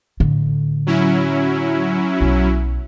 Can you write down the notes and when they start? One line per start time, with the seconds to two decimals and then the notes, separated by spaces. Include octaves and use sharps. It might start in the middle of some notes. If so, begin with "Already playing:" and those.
0.20 A2 D3
0.87 F#3 C#4 E4
2.21 B1